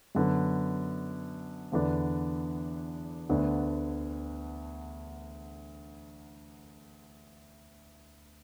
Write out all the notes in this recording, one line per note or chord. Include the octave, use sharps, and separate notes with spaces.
F#2 D3 B3
E2 D3 B3 D4
D2 D3 B3 D4